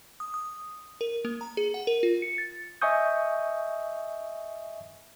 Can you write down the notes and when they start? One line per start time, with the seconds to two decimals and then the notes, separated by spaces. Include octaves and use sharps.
0.20 D#6
0.34 D#6
1.01 A#4
1.25 A#3
1.41 A#5
1.57 G#4
1.74 F#5
1.87 A#4
2.03 F4
2.22 C#7
2.38 A6
2.82 D#5 E5 G#5 C#6 D#6 G6